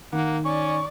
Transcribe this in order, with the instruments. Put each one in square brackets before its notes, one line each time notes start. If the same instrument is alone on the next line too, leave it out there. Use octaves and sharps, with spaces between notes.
[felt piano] D#3 [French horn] A#3 [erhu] F#5
[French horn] C#4 [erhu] D5 [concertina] C#6